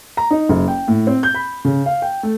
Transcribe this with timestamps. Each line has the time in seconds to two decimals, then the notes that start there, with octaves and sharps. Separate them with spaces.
0.17 A#5
0.31 D#4
0.49 F#1
0.68 G5
0.88 A2
1.07 C4
1.23 G6
1.35 B5
1.65 C#3
1.86 F5
2.02 G5
2.23 A3